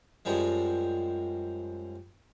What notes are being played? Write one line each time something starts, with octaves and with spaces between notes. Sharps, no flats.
F#2 F3 G3 G#3